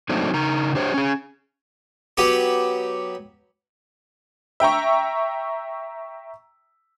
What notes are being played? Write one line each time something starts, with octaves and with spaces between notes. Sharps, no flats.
F#3 A3 A#3 C4 D4 D#4
C#3 D#4 A#4 A#5
D4 G4 C5 C#5
C#4 G#4
F#3 B3 G4
E5 G5 A#5 C#6